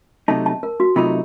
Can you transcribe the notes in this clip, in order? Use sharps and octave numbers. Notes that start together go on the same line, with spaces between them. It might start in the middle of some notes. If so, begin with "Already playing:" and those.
C3 F#3 A3 D#4 A5
A5
A#4
F#4
C3 F#3 A3 D#4 F4